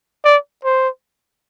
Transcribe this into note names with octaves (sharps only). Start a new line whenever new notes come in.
D5
C5